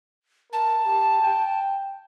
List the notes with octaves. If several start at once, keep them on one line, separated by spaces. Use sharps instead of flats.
A#4 A5
G4
G5